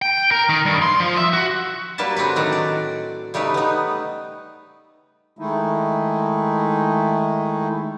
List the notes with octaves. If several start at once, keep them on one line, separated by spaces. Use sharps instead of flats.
G5
A#4
D#3
G2
C6
F3
E5
F#4
F#3 G3 A#3 B4 A5
D3 C4 D4 F#4 B4
A2 D#3 F#3 D4 F#4 F#5
D5
C#3 G3 A3 D#4 B4
B3 D#4
D#3 G#3 A3 D#4 E4